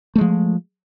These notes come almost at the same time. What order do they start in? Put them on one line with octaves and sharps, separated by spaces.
A3 G#3 F3